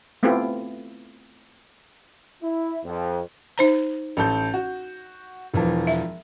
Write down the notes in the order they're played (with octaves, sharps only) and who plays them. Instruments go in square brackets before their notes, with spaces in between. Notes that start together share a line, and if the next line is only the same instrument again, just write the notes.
[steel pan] A3 B3 C4 E4 F4 G4
[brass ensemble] E4
F2
[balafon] D#4 C5 A#5
[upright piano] A1 A4 G6
F#4
E1 E3 F3
[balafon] E5